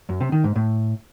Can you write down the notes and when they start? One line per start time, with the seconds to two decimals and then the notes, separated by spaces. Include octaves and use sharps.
0.09 F#2
0.21 C3
0.32 D#3
0.44 G#2
0.56 A2